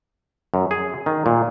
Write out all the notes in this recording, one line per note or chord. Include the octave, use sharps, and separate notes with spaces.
F#2
G#4
D#3
A#2